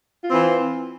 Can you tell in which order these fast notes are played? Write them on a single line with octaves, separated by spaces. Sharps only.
F4 C4 E3